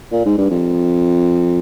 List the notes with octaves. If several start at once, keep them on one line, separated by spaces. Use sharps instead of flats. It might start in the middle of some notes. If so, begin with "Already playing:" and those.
A#2
G#2
G2
F2